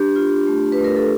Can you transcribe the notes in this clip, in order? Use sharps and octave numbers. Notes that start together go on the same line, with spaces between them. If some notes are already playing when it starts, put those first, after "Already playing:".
Already playing: D4 G4
F4
A3
B4
A3
A#4
A4